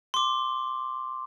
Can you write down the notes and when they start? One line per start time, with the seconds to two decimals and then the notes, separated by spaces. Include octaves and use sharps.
0.14 C6 D6